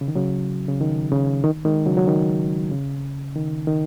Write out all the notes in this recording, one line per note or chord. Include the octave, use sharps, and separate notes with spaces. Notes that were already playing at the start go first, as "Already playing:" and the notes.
C#3
D#3
C#3 F#3
C#3
D#3
C#3
D#3
D#3 G#3
C#3 F#3
F#3
D#3
C#3
D#3
D#3